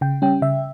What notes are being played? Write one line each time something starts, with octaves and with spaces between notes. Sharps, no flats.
C#3 G5
G3 C#4 G5
C#3 E5